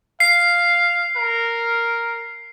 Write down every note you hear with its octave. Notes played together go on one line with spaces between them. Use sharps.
F5 C7
A#4